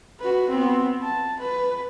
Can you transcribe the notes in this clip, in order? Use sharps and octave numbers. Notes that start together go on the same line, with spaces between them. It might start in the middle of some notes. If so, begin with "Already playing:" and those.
F#4 B4
B3 C4
A5
B4